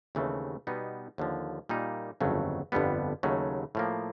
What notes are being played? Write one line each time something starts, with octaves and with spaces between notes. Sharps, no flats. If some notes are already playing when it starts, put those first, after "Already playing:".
D#2 C#3 E3 A3 C4
B2 G3 B3 D#4
D#2 D3 F3
A#2 G3 A#3 D#4
G1 F2 C#3 F#3 A3
G1 F2 D3 G3 B3
D#2 C#3 F#3 A3
A2 F3 A#3